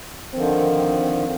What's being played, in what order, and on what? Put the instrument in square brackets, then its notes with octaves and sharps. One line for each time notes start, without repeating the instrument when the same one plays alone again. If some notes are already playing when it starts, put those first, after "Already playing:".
[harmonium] D3 D#3 F3 [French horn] C4